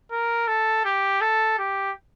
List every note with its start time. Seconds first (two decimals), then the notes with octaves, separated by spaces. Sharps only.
0.11 A#4
0.48 A4
0.85 G4
1.21 A4
1.59 G4